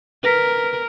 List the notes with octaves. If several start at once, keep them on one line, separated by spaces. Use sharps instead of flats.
A#4 B4 A#6 B6